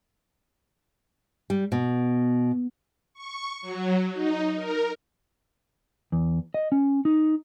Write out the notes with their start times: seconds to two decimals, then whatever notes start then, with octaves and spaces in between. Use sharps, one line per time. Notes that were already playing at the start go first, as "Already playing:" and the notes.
1.50 G3
1.72 B2
3.14 C#6
3.61 F#3
4.13 D#4
4.56 A#4
6.12 E2
6.54 D#5
6.72 C#4
7.05 D#4